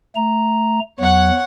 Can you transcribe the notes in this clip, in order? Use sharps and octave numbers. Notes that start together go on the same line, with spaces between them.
A3 A#5
E2 F#3 C#5 F#5